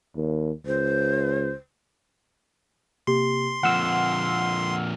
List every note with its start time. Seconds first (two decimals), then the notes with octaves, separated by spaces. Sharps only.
0.16 D#2
0.66 C#2 C5
3.07 C3 A#3 G4 C6
3.63 F2 A#2 F#5 E6 F6